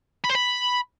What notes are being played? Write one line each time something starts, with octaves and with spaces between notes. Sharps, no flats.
B5
C5
B5